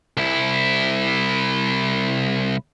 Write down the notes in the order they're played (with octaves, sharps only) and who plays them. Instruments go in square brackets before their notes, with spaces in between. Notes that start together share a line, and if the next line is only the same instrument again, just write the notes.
[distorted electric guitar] C2 E4